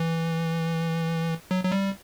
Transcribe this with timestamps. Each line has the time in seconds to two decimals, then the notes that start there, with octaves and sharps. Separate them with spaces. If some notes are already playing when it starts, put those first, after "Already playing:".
Already playing: E3
1.51 F#3
1.64 F#3
1.72 G3